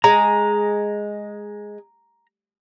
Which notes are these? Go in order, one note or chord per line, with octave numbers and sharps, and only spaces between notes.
G#3 A#5